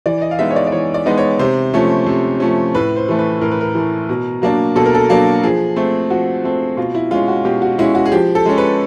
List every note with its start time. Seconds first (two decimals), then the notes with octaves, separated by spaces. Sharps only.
0.06 E3 D5
0.22 D#5
0.31 F5
0.39 G#3 B3 D#4 E5
0.51 C#5
0.56 D5
0.67 D5
0.72 E3 C#5
0.94 D5
1.06 G#3 B3 D#4
1.18 C#5
1.39 C3 C5
1.74 F3 A3 C#4
2.06 C3
2.40 F3 A3 C#4
2.75 A2 B4
2.96 C5
3.08 E3 A3
3.19 B4
3.41 A2 A#4
3.52 B4
3.61 A#4
3.75 E3 A3
4.09 B2
4.42 F#3 A#3 D4
4.76 B2 A4
4.86 A#4
4.95 A4
5.10 F#3 A#3 D4
5.43 F3 G#4
5.76 A3 C4
6.10 F3 F#4
6.44 A3 C4
6.77 B2 F4
6.95 E4
7.11 G#3 C#4 F4
7.28 F#4
7.45 B2 G4
7.62 F#4
7.78 G#3 C#4 E4
7.95 F#4
8.06 G#4
8.12 F3 G4
8.35 A4
8.46 G#3 C#4
8.58 B4